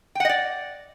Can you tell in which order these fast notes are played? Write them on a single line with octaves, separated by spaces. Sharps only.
G5 F#5 D#5 D5